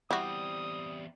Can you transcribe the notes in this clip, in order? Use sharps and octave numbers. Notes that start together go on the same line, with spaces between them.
E2 G3 C4 E4 F#4 D#6